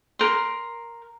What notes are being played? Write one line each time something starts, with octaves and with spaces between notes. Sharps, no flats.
A#4 C6